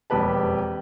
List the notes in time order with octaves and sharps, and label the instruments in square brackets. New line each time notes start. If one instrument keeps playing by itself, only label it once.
[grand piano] E1 F2 G4 B4 A5